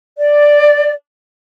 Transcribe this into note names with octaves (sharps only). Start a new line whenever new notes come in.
D5